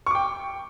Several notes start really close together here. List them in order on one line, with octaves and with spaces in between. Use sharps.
C#6 D6 G5